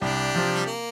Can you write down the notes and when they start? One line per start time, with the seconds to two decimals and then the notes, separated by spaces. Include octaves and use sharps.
0.01 C2 D4 G4
0.35 C3 F3 C4 F4
0.54 G3
0.67 A#3